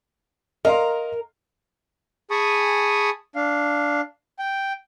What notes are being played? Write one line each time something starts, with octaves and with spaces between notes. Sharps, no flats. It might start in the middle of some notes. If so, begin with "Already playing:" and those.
A#4 D#5 F5 C6
G#4 G#5 A5 B5 C#6 D#6
D4 F5
G5